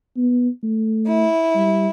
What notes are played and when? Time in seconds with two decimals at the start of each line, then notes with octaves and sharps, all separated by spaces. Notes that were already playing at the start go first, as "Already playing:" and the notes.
0.17 B3
0.63 A3
1.09 E4
1.55 G3